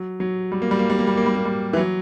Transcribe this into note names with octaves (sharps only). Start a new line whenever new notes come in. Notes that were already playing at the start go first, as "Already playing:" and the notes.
Already playing: F#3
F#3
G3
A#3
G3
A#3
G3
A#3
G3
A#3
G3
A#3
G3
E3
F#3